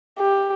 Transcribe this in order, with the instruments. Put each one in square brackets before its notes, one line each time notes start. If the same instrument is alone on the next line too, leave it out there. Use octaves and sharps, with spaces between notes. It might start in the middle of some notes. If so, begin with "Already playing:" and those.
[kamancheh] G4